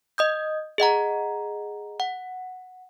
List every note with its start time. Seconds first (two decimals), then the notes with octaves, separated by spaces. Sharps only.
0.18 D#5 D#6 G6
0.78 G#4 D#5 F#5 A#5
2.00 F#5